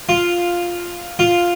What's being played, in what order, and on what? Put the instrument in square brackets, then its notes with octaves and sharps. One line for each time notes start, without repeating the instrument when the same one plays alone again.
[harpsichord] F4
F4